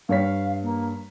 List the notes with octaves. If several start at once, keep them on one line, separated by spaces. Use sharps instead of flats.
G2 C#5 F5 B6
A#3